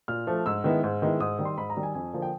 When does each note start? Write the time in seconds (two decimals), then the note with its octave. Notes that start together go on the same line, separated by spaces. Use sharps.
0.08 A#2 F6
0.27 F3 A3
0.46 G#2 E6
0.64 D#3 G#3 B3 E4
0.84 G#2
1.02 D#3 G#3 B3 E4
1.20 G#2 D#6
1.39 D#3 G3
1.45 C6
1.57 G#2 B5
1.70 A#5
1.77 D#3 G3
1.83 G#5
1.94 F2 G#5
2.13 D3 F3 A#3
2.22 G5